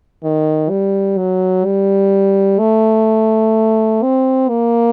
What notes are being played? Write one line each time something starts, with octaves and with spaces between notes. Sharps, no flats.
D#3
G3
F#3
G3
A3
C4
A#3